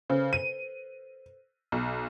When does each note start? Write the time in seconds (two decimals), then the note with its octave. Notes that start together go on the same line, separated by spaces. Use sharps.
0.10 C#3 A4 B4 C5
0.33 D#7
1.72 B1